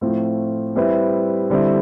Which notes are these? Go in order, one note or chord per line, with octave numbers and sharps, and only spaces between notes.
A2 F3 A3 C4 F4
G3 C4 E4 B4 E5
D3 G3 C4 E4